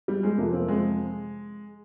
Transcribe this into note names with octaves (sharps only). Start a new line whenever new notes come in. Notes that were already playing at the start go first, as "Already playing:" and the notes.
G3
G#3
F2 C3 F3 A#3
C4
G#3